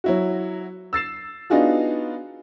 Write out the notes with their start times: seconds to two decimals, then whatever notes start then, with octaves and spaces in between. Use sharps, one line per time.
0.04 F#3 E4 F#4
0.93 E6 A6 C7 E7
1.50 B3 D4 D#4 F4 F#4 G#4